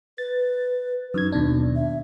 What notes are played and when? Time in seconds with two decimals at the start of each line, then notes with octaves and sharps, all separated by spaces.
0.18 B4 A6
1.14 F#2 D#4 G#6
1.32 D#2 B2 D4
1.76 E5